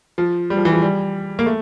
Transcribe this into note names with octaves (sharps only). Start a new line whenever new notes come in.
F3
G3
F3
E3
F3
G3
A#3
A3